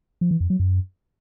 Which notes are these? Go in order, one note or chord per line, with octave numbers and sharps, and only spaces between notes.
F3
E3
F2
F#3
F#2